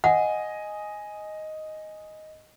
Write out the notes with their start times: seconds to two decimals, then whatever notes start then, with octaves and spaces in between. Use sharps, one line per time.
0.04 D#5 F#5 G#5